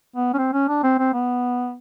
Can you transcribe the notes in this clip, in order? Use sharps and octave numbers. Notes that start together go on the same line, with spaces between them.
B3
C#4
C4
C#4
D4
C4
C4
B3